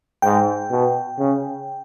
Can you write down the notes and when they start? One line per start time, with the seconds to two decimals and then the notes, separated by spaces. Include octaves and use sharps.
0.22 G#2 G5
0.70 B2
1.19 C#3